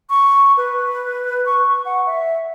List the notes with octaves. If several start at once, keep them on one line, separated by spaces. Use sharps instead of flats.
C#6
B4
C#6
F#5
E5